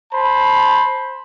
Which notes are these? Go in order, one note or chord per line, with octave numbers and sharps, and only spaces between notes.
C5 A5 B5